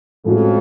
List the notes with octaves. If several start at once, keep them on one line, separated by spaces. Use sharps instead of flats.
F2 A2 F3 G#3 C#4 F#4